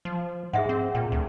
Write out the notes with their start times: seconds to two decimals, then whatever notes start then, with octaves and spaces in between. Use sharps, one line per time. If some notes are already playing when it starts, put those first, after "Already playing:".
0.05 F3
0.53 G#2 G#4 E5 F#5
0.69 C4
0.95 A#2 G5
1.12 D2